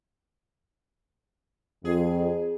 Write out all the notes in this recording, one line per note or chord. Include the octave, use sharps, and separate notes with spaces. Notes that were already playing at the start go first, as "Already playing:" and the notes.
F2 G#4